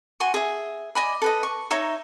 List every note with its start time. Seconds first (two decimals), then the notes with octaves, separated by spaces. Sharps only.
0.20 F#4 G#5 C6 C#6
0.34 G#4 E5
0.95 D5 D#5 G#5 B5
1.22 A4 B4 D#5
1.43 C#6
1.70 D#4 C#5 E5 A#5